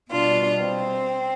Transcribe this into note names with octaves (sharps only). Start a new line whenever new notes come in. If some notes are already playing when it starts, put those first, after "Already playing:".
B2 G3 D4 F4
C4